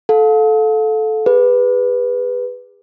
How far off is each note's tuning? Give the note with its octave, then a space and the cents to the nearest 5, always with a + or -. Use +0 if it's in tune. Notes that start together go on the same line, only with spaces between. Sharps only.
A4 -15 F5 +35
G#4 -40 B4 +0